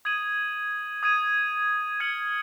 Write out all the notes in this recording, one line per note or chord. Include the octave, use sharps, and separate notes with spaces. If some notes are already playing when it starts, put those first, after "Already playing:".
D#6 G#6 D#7 F#7
D#6 G#6 D#7
F6 G#6 C#7 F#7